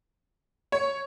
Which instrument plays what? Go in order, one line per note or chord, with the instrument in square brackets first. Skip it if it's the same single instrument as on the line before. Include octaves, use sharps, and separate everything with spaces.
[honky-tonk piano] C#5